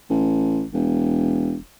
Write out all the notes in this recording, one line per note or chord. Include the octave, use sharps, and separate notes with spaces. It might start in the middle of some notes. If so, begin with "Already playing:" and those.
A1
E1